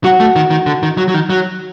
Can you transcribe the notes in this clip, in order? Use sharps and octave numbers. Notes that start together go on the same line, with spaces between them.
F#3 F#4
A3
D#3
D#3
D3
D#3
F#3
F#3
D#3
F#3